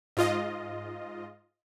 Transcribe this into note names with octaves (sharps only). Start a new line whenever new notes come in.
G#2 F4 D#5